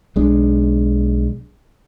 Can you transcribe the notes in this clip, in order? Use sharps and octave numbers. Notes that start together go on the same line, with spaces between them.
B1 G#3 D4